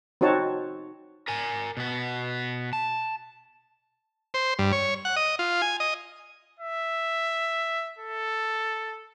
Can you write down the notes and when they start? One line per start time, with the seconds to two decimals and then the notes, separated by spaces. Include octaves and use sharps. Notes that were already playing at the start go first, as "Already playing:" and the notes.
0.21 C4 D#4 F#4 C#5 A5
1.28 A#4 G#5
1.77 B2 B3
2.73 A5
4.34 C5
4.59 G2
4.72 C#5
5.05 F#5
5.16 D#5
5.39 F4
5.62 G#5
5.80 D#5
6.59 E5
7.99 A4